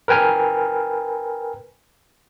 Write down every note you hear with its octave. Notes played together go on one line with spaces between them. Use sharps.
A#4 B4 G5 G#5 F6